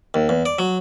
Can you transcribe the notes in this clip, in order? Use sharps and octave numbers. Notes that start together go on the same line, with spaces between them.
D#2
E2
D5
F#3